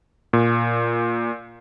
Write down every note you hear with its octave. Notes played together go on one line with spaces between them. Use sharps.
A#2